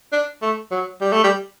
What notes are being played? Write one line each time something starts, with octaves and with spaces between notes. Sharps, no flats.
D4
A3
F#3
G3
A3
G3